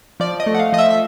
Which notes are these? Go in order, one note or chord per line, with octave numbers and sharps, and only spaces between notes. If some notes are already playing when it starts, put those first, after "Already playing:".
F3 D5
D#5
A3
F#5
F5
F3 D#5
E5
E5